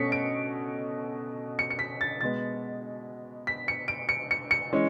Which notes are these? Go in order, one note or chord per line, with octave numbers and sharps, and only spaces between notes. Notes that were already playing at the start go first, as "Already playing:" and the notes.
Already playing: B2 A3 C#4 B6 C#7
D7
C#7
C#7
B6
A6
B2 G#3 B3 A6
B6
C#7
D7
C#7
C#7
C#7
E3 G#3 C#4